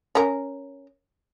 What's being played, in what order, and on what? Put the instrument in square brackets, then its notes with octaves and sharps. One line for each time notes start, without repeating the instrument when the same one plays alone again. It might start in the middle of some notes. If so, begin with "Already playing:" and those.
[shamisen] C#4 A#4